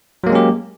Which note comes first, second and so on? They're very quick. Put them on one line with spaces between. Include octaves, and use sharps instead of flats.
F#3 A#3 G#3 C#4 G4